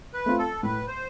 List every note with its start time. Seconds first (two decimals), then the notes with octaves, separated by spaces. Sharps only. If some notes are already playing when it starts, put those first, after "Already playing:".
0.14 B4
0.26 A3 C4 F4
0.39 A4
0.63 A2 B4
0.88 C5